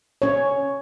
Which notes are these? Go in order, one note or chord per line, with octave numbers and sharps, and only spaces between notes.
C#4 C#5